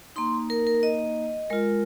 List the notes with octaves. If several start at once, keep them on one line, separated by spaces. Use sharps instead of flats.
A#3 D#4 C6
A#4
A#4
D#5
G#3 F4 A#4